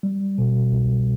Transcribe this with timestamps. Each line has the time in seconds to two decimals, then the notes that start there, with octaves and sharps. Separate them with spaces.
0.03 G3
0.38 B2
0.72 C2